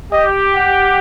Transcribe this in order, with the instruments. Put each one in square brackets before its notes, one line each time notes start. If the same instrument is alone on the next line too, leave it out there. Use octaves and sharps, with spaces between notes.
[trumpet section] G4 [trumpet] D#5
[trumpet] F#5